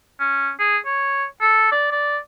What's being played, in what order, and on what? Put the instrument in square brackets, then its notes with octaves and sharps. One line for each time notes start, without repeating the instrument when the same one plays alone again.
[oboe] C#4
G#4
C#5
A4
D5
D5